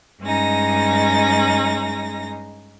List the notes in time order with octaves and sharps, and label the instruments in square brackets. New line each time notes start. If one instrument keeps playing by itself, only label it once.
[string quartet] G2 G#3 C#4 D#4 A#6